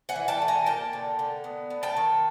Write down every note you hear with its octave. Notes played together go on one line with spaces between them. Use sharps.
F#5 G#5
E3
G5 A5
A3
G#5 A#5
A#3 G5 A5
D3
D3
B3
B3
G5 A5
D#3